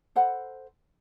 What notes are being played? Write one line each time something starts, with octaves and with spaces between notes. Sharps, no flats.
A4 C5 F#5 B5